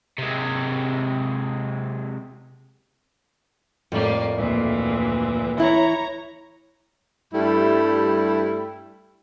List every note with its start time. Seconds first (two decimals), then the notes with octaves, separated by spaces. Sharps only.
0.18 C3 G#3
3.92 F2 A2 G3 A#3
4.36 D2 A#2 E3
5.58 E3 E4 C#5 A#5
7.34 G2 G3 A3 E4